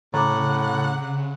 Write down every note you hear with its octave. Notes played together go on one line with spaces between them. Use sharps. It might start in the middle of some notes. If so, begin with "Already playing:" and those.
A2 C#3 F#5 A#5 D6